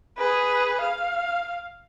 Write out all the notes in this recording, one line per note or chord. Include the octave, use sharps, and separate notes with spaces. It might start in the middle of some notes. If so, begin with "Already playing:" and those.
G#4 B4
F5